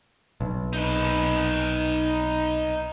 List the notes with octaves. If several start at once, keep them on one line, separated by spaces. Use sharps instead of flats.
B1
D#4 B4